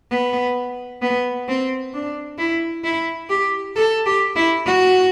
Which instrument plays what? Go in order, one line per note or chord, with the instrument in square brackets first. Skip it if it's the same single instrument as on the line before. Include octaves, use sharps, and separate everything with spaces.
[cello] B3
B3
C4
D4
E4
E4
G4
A4
G4
E4
F#4